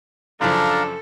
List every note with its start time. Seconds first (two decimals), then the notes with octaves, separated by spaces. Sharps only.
0.41 F#2 C#3 F3 D4 A4 F5 A#5